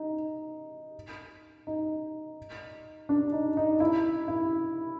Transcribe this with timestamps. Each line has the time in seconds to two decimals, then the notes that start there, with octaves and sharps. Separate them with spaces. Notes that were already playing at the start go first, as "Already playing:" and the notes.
Already playing: D#4
1.67 D#4
3.09 D4
3.32 D#4
3.57 D#4
3.80 E4
4.28 E4